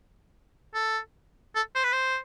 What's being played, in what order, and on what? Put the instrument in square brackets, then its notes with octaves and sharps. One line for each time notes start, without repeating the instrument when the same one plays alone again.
[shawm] A4
A4
C5
B4
C5